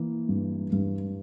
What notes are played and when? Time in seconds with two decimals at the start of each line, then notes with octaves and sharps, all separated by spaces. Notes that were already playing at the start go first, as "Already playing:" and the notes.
Already playing: E3 A#3
0.29 G2
0.72 G2